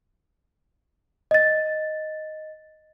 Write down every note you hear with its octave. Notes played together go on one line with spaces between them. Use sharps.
D#5 A6